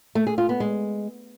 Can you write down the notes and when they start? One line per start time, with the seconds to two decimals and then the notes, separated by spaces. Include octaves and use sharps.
0.15 A3
0.27 G#4
0.38 F4
0.49 B3
0.60 G#3